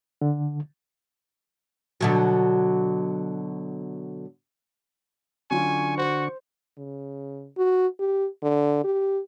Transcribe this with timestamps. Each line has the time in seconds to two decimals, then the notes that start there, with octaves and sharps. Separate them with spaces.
0.21 D3
2.01 B2 D3 F#3
5.51 D3 F#3 C#4 F4 G#5 C#6
5.98 F#4 C5
6.78 C#3
7.58 F#4
7.99 G4
8.43 D3
8.84 G4